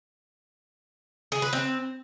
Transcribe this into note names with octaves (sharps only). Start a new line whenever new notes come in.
G#4
B4
C4